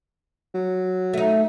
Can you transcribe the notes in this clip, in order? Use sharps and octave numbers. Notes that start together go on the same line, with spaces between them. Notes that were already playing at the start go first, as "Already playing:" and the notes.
F#3
A3 D#4